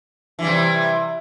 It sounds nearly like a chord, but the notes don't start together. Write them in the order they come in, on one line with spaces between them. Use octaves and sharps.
E3 G3 C3